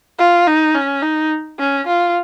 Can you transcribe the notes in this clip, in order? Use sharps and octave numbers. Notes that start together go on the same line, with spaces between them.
F4
D#4
C#4
D#4
C#4
F4